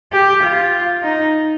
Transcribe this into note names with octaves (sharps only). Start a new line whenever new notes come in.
G4
F4
D#4